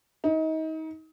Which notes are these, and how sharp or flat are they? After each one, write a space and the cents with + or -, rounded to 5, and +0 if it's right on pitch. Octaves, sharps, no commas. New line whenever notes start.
D#4 +30